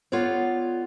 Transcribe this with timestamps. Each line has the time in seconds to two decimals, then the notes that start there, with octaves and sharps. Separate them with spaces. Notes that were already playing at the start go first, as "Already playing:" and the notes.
0.12 B3 F4 A4 C#5 D5